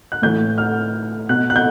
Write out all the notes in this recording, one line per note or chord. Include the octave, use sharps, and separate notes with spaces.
F#6
A2 E3 G6
F6
B2 F#6
F#6
G6